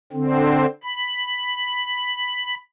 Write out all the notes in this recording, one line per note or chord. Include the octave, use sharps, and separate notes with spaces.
D3 C4
B5